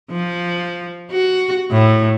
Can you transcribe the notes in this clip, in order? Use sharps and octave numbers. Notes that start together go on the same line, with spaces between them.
F3
F#4
A2